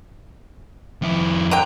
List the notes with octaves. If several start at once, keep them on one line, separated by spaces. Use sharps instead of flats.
F2 E4
D3 F#3 G5 A#5